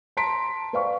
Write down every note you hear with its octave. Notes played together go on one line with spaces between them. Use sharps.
A5 A#5 C6 B6 D7
B4 C5 D5 F5 G5 C#6